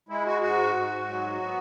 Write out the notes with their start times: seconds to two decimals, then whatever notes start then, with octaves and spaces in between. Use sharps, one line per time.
0.09 G#3 E4
0.26 F#4
0.42 G#2 F#4
0.75 G#2
1.09 F#3
1.43 B3